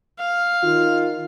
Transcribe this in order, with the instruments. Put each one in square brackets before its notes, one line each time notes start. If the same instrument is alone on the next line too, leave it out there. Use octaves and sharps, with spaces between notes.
[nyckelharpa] F5
[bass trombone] D#3 [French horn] F4